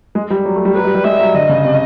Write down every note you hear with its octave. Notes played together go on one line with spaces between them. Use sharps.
G#3
G3
F#3
A3
G3
F#3 B4
G3
G3
G#3 E5
F#3
D3 D#5
C#3
C3